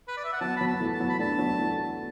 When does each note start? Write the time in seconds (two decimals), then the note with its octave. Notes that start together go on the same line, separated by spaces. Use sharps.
0.08 B4
0.17 D5
0.24 E5
0.33 F#5
0.41 F#3 B3 A5
0.56 F#3 B3 B5
0.67 A5
0.74 B3
0.80 E3 A3
0.94 A5
1.00 F#3 B3
1.09 B5
1.19 A3 D4 A5
1.38 F#3 B3
1.59 E3 A3